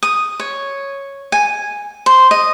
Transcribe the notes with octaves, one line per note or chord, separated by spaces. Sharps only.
D#6
C#5
G#5
C5
D#5